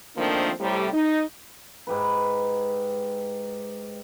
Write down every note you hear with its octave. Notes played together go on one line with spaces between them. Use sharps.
D#3 F3 A3 A#3 C4 D4
A2 C3 G3
D#4
G#2 G4 B4